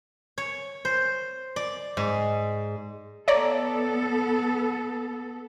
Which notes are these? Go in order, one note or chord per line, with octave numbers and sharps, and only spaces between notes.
C#5
C5
D5
G#2
B3 A4 C#5 D5 A#5